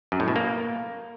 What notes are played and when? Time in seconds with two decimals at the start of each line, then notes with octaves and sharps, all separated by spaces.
0.12 F#2
0.20 A2
0.28 B2
0.36 A#3